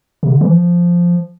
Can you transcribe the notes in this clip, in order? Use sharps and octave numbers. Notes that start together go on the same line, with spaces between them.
C3
D3
E3
F3